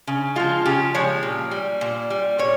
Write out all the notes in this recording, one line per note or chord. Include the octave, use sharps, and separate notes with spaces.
C#3
F3 G#3 F4
C#3 G4
F3 G#3 C#5
A#2
G3
A#2
G3
A#2 C#5